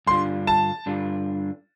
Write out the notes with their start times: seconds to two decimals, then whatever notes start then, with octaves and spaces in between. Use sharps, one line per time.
0.07 G2 D3 G3 D4 F4 C6
0.47 A5
0.86 G2 D3 G3 D4 F4